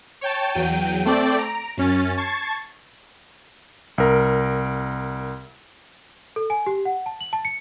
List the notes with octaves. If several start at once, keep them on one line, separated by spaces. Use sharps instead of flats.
C#5 G5 A5
E2 F#3 G5 D#7
A3 C4 A4 D5 G5
A#5 D7
F#2 C#4 A6
A5 C#6 G#6 A6 C7
C2 A#4
A4
G#5
G4
F#5
A5
F#7
A5
C#7